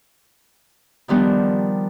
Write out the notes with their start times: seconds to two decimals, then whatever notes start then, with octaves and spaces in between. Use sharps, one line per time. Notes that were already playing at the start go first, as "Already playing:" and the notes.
1.08 D#3 F3 G3 B3 D4